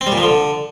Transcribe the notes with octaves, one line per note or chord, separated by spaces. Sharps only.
C4
G3
A#2
F3
D3